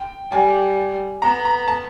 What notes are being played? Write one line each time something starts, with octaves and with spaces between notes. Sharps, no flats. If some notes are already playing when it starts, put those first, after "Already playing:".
Already playing: G5
G3 G#5
B3 A#5
A#5
A5